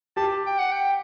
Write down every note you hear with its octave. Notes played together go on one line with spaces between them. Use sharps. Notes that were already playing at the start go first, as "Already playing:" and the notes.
G4 A5
G5
F#5
G5